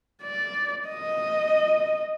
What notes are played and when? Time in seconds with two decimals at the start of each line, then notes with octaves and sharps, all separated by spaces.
0.23 D5
0.88 D#5